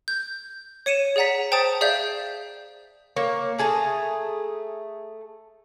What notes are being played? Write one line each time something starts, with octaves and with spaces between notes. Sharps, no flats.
G6
C#5 C#7 D#7 E7
G#4 D5 F#5 A#5 B6
C5 G5 A5 A#5 D#6 A6
G#4 D5 E5 F5 G6
A#3 C#5
A3 G#4 A5 A#5